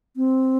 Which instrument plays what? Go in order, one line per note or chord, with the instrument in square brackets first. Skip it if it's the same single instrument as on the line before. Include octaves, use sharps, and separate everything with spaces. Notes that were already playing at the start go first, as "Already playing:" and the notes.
[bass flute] C4